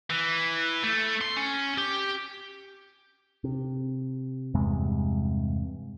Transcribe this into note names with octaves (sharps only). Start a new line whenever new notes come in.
E3
A3
C6
C#4
G4
C3
E2 G2 C3 G#3